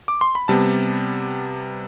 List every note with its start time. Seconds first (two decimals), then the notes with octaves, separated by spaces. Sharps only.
0.08 D6
0.21 C6
0.35 B5
0.48 C3 G3 B3 A5